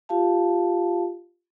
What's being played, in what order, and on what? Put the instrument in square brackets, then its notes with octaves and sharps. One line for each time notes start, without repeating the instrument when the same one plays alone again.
[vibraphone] F4 G4 F5 A5